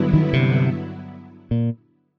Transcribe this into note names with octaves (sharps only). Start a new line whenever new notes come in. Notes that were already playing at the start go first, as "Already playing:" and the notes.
Already playing: G2 D3 F#3 B3 E4
D#3
C3
A#2